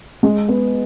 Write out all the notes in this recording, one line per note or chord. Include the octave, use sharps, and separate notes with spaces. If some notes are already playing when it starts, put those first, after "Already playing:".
G#3
B3